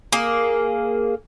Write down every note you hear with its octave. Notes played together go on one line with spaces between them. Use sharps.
A#3 G#4